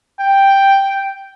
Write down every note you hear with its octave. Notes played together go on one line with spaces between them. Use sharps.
G5